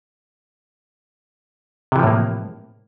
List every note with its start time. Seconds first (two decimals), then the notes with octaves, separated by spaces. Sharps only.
1.92 C3
1.96 E3
1.99 F3
2.03 A2
2.07 A#3